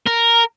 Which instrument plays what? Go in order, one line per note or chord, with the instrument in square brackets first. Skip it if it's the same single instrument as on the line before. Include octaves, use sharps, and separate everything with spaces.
[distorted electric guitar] A#4